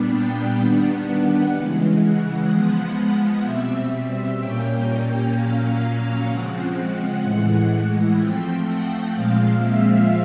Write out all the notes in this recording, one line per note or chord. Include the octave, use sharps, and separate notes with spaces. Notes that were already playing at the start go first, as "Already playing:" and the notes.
Already playing: A#2 G3 B3 D4
G5
D#3 G3 B3 D4 F#5
C#3 E3 G#3
F#5
F3 G#3 B3
B2 G3 C4 E5
A#2 G3 A#3 C#4 G5
A#2 F#3 A#3 C#4 F5
C#3 F3 G#3 C4 F#5
A2 E3 G#3 F#5
F3 A3 C4 G5
F#5
A#2 F3 G#3 C4 F5
E5